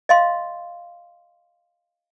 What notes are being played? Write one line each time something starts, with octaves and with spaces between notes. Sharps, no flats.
D#5 F5 C6